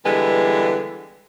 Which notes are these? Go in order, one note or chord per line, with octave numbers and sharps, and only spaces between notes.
D3 E3 G3 G#3 B3